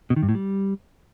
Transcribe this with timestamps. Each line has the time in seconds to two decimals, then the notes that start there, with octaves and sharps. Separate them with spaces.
0.10 B2
0.16 D#3
0.23 G2
0.29 A2
0.35 G3